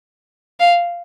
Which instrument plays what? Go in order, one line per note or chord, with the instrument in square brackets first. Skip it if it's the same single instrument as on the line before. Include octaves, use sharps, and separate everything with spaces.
[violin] F5